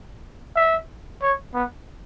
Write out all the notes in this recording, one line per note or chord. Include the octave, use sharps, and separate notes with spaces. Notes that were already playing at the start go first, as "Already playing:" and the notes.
E5
C#5
B3